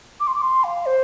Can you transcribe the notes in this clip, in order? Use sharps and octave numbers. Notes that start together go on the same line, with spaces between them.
D6
C6
D6
C6
F5
C5